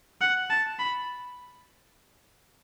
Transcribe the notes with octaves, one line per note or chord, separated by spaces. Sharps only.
F#5
A5
B5